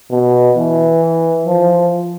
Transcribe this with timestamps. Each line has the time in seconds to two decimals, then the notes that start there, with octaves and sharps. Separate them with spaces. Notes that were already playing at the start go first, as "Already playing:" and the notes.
0.11 B2
0.56 E3
1.46 F3